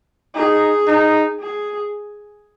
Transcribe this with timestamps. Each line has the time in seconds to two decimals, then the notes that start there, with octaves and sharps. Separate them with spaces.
0.35 D#4 G#4
0.87 D#4
1.40 G#4